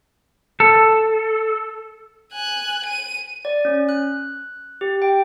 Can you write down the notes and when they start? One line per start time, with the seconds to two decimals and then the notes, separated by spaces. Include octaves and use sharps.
0.60 A4
2.33 G#5 F#6
2.86 D#7
3.45 D5
3.65 C#4
3.89 F#6
4.81 G4
5.02 G5